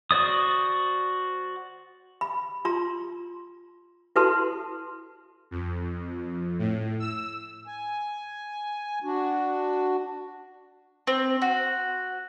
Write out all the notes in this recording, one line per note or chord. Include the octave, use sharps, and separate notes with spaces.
F#4 C5 D5 D#6
B5
F4 A#5 C6
E4 F#4 A4 B4 A5 C6
F2
A2
E6
G#5
D4 F#4
C4
F#4